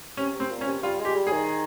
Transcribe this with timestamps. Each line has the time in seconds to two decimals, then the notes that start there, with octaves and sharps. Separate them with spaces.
0.17 C3 C#4
0.34 C3
0.40 C4
0.50 A#2
0.61 C#4
0.67 C3
0.83 G3 F4
1.00 G#3
1.05 G4
1.15 G3
1.27 G#4
1.32 D#3